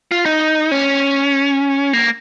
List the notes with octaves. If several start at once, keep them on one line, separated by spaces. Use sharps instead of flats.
F4
D#4
C#4
A#3